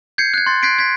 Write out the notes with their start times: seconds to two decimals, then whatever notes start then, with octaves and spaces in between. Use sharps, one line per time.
0.18 G6 G#6 C7 C#7
0.34 F#6 G#6
0.46 C6 A6
0.63 F#6 G#6 B6 C7 D7
0.79 G#6 B6